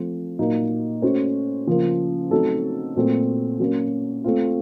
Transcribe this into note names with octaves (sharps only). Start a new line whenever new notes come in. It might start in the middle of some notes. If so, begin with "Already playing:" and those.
Already playing: F3 A3 C4
A#2 F#3 A#3 D#4
A3 C#4 F#4 C5
C#3 F3 A#3 F4 A#4
F#3 A3 C4 D#4 A4
A#2 F#3 A3 C4
F#3 A#3 C#4
A3 C4 F4